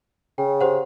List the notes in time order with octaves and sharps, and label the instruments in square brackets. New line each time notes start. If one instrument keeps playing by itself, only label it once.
[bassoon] C#3 [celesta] G5
[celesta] G4 C5 F#5